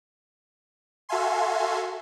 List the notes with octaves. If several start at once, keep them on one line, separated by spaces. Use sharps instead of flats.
F#4 A4 E5 F5 G#5 C6